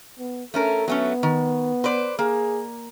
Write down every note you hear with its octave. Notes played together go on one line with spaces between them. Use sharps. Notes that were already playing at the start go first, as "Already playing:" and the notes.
B3
A3 C#4 A4 A#4
F#3 A3 B3 C#4
D#3
B4 C5 D5
A#3 G#4